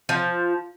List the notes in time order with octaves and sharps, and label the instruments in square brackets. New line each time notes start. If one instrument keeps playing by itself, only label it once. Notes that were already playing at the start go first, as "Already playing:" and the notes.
[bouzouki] F3